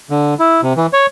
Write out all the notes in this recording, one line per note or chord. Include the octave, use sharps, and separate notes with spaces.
D3
E4
C3
E3
C#5